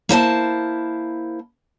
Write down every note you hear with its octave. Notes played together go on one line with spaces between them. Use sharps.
A#3 E4 C5 A5